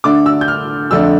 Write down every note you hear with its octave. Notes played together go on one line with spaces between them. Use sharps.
D3 A3 D4 D6
E6
G6
F6
F2 D3 A3 D4 E6